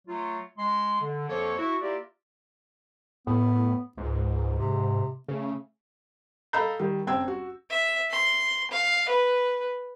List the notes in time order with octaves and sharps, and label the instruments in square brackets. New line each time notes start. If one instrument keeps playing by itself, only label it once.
[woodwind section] F#3 A3 F4
G#3 C6
D3
F2 F3 A#3 A4 C5 C#5
E4 F#4
A#3 E4 F4 G4 A#4 D5
[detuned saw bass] A2 [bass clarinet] B3
[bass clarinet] C#2 [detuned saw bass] G#2
[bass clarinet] C3
[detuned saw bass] C#3 [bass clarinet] A3
[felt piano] A4 D#5 F5 A#5 B5 G6
D#3 G3
F#1 C4 G5 E6 G#6
F#4
[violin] E5
C6
F5
B4